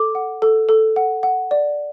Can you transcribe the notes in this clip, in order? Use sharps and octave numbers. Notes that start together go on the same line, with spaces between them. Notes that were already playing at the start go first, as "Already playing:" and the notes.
Already playing: A4 D6
F#5
A4
A4
F#5
F#5
D5